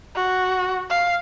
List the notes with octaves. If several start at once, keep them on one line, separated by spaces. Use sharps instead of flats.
F#4
F5